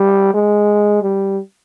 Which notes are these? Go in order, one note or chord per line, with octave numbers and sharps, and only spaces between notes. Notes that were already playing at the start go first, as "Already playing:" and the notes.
Already playing: G3
G#3
G3